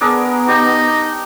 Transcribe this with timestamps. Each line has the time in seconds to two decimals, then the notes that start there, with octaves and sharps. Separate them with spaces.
0.01 B3 D4 G#4 A#4
0.48 D#4 G4